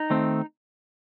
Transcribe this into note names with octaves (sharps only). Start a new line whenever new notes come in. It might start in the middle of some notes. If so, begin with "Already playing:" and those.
Already playing: D#4
D#3 A3 C4